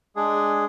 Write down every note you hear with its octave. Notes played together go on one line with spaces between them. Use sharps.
G#3 D4 G#4